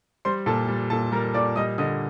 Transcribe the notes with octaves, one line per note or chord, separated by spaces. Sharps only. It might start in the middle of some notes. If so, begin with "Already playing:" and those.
G3 C5 C6
A#2 A4 A5
G3
A#2 A4 A5
G3 A#4 A#5
A#2 D5 D6
G3 D#5 D#6
D3 D#5 D#6